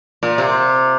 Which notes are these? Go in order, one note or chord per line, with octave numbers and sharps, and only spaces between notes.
A#2
C3